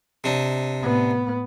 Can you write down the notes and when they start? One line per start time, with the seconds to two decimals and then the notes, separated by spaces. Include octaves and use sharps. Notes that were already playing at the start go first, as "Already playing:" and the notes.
0.24 C3 D4 D#4
0.79 A2 B3